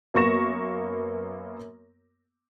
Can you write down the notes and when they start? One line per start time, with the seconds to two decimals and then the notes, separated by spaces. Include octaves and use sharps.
0.14 F#2 A#3 B3 C#6 A#6 E7